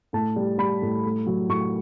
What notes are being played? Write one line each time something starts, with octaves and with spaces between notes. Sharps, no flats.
A2 A5
G3
G3 B5
A2
A3
F#3
A2 C#6